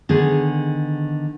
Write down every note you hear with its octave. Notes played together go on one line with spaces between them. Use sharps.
D3 D#3 B3 G#4